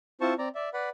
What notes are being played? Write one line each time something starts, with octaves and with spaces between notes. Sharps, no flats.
C4 E4 F4 C5 A5 C#6
C4 D5 A#5
D5 E5
B4 D5 F#5 B5